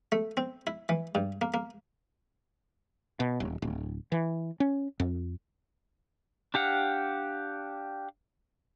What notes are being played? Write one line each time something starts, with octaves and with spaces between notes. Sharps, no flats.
A3
C4
E4
E3
G2
A#3
A#3
B2
D#1
D1
E3
C#4
F2
D4 G4 F5 F#5